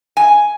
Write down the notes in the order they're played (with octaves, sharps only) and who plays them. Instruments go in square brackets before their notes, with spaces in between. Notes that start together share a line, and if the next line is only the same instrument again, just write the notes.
[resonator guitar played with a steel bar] G#5